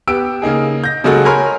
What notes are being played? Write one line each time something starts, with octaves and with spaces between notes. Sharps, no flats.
B3 G4 E6 D7
C#3 A#3 D#4 G#4
G6 A#6
C#3 F#3 G#3 A#3 F#4 A4
A#4 C#5 G#5 B5 C6 F6